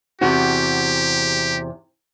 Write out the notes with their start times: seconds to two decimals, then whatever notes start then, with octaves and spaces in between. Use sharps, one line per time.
0.21 E2 C3 F#4 G4